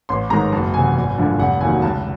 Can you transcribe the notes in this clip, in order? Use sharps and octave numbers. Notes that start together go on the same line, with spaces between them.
A1 C6
G#2 D#3 G#3 A#5
F#1 A5
E2 C3 G#5
G#1
G2 D3 F3
F1 F#5
D#2 D#3 F#3 G#5
C#2 A5